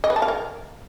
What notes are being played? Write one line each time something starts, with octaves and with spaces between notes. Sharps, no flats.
D#5
B4
A5
F5
A#4